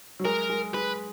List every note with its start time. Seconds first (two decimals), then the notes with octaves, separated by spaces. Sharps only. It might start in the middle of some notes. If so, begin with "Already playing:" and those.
0.20 F#3
0.25 G#3 A#4
0.49 G#3
0.74 G#3 B4